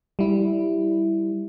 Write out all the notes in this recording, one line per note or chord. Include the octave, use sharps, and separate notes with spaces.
G3 E4